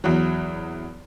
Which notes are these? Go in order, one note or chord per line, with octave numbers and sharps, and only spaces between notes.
E2 F#3